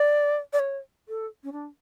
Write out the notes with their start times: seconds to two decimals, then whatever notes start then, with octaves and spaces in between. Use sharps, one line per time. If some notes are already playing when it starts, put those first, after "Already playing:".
Already playing: D5
0.53 D5
0.59 C#5
1.09 A4
1.44 C#4
1.52 D4